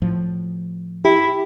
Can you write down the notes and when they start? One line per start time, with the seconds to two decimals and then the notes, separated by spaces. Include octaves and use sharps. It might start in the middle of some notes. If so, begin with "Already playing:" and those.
0.02 A2 F3
1.05 E4 G4